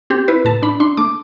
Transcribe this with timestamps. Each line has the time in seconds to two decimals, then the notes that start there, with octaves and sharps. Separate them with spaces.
0.10 C4 G4
0.28 E4 B4
0.45 A2 A5
0.62 D4 B5
0.80 D4 C6
0.97 A3 D6